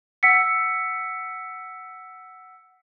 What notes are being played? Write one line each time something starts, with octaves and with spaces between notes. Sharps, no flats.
F#5 E6 B6 C#7